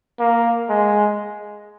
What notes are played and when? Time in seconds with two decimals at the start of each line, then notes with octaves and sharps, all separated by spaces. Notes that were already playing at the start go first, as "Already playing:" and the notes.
0.19 A#3
0.69 G#3